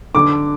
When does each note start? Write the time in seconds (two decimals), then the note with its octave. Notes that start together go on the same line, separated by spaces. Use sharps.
0.15 D3 D6